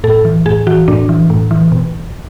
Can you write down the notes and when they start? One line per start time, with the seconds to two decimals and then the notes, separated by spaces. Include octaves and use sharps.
0.04 A2 A4
0.25 E3
0.46 A2 G#4
0.67 E3 F#4
0.88 A2 D4
1.09 E3
1.30 A2
1.51 E3
1.72 B2